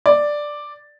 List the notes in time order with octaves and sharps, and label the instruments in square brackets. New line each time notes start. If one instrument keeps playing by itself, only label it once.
[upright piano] D5